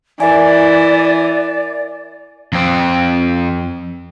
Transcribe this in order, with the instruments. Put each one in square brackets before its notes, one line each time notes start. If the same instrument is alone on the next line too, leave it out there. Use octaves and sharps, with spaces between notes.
[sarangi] E3 [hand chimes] A#4 E5 G#5 [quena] D5
[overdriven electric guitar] F2 C4